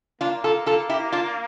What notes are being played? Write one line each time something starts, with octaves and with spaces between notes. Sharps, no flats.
A#3 D4 F4
F4 A4
F4 A4
E4 G4
D4 F4